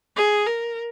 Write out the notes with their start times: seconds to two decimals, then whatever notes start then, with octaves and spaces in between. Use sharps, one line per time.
0.16 G#4
0.47 A#4